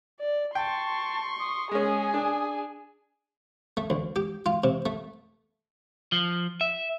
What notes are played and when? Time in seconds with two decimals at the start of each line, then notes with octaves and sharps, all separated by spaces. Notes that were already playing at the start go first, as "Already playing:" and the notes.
0.20 D5
0.55 G5 A5 C6 C#6
1.39 D#6
1.71 G#3 C#4 G#4 G#5
2.14 D4
3.77 A3
3.90 D2
4.16 G4
4.46 F4
4.64 C3
4.86 A3
6.12 F3
6.61 E5